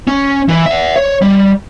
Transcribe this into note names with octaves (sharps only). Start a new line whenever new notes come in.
C#4
E3 E4
E5 F#5
C#5
G3